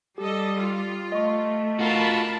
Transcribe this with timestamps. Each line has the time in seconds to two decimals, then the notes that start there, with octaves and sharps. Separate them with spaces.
0.18 G3 G4 A4 D#5
0.56 F4
1.12 A3 D#5 C#6
1.79 F4 F#4 A#4 A5 B5